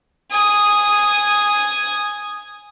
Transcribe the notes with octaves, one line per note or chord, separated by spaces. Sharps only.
G#5 D#6